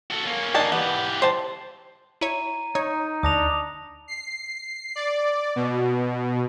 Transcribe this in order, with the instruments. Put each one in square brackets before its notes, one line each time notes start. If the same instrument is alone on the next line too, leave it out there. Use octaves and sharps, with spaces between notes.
[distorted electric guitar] F#4 A4
A#3 C#4
[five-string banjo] D4 D#4 A5
[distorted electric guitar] E3 G4 [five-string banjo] B3
[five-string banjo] C5 A5
[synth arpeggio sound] E4 C#5 [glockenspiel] A#5 D#7
[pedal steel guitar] D#4 [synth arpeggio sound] C#5
[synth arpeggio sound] D2 [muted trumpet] D4 [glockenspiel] D#6 A#6 F7
[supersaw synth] C7
D5
B2